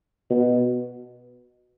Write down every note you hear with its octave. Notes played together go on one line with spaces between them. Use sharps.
B2